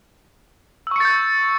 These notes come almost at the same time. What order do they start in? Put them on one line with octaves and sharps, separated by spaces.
E6 C#6 C#7 A6 G6